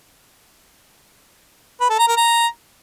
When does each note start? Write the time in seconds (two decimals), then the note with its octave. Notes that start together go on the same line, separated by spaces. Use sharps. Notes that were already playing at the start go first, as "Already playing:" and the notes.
1.81 B4
1.90 A4
1.99 A#5
2.08 A#4
2.17 A#5